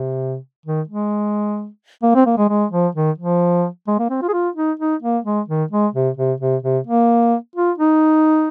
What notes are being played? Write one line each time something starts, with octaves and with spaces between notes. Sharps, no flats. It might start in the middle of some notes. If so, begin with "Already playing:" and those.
Already playing: C3
D#3
G#3
A#3
C4
A#3
G#3
G#3
F3
D#3
F3
G#3
A#3
C4
F4
G#4
F4
D#4
D#4
A#3
G#3
D#3
G#3
C3
C3
C3
C3
A#3
F4
D#4